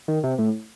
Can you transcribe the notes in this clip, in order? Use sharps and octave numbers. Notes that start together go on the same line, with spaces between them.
D#3
C3
A2